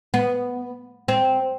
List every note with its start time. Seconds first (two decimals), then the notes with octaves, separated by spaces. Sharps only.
0.14 B3
1.08 C4